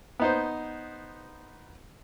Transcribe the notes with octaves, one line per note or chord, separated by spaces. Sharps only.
B3 D#4 C5